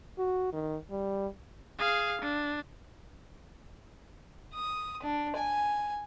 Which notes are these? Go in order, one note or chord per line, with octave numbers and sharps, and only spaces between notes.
F#4
D#3
G3
G#4 F5
D4
D#6
D4
G#5